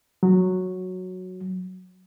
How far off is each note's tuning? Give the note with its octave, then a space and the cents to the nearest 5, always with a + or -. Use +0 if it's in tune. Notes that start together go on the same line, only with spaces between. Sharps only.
F#3 -5